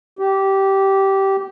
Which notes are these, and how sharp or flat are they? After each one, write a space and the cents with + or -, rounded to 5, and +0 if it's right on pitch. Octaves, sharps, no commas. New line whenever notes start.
G4 -15